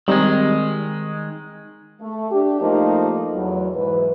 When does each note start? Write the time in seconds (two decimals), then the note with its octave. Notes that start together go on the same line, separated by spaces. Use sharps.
0.08 D#3 G3 G#3 C4 D#4
2.00 A3
2.31 D4 G4
2.60 F3 A3 A#3 D#4
3.33 E2 F#3
3.76 G#2 E3 B4